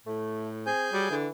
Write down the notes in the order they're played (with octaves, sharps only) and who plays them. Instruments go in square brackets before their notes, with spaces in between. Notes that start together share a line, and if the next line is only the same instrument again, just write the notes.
[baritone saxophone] A2 [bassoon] A3
[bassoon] C4 [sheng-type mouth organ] G#4 G#5 G6
[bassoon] F#3 [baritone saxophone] G3
[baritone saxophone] D3 [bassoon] E3